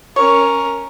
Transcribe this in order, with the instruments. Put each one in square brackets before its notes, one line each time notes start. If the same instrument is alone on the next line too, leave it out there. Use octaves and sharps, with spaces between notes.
[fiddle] C#4 A#4 [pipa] C#5